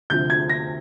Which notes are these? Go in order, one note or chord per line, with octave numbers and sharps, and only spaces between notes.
D2 C3 F3 G6
G#6
A#6